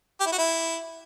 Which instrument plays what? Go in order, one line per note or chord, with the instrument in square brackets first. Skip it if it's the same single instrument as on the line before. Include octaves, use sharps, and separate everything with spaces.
[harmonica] G4
E4
F#4
E4